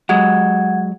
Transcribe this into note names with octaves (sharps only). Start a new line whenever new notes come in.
F#3 G#3 F#5 G#6